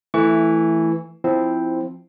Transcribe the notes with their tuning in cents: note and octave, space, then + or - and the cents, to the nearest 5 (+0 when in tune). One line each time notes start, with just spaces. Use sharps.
E3 +0 A3 +5 C#6 +30
F3 +0 C4 +0 E4 +0